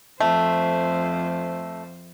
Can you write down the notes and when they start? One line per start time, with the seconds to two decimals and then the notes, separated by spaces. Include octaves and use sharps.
0.20 F2 A3 C5